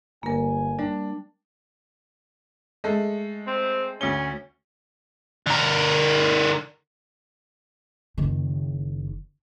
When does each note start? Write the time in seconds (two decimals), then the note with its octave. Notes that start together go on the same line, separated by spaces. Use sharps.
0.23 G1 A#3 A#4 G#5
0.79 G3 D4
2.84 G#3 A3 A4
3.47 C4
4.01 D2 C#4 G7
5.47 D3 A#4
8.18 F#1 D#3